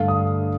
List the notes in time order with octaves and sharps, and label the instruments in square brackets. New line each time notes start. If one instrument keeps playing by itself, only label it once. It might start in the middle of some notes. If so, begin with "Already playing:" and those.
Already playing: [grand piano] G2 D3 A3 D4 F5
D#6